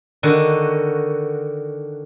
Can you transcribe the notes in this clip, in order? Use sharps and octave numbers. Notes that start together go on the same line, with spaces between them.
D3 D#3 F#4